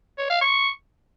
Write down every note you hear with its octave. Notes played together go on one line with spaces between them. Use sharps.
C#5
F5
C#6